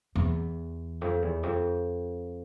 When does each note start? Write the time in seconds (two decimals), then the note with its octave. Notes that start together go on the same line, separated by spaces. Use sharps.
0.15 E2
1.01 F2
1.22 E2
1.43 F2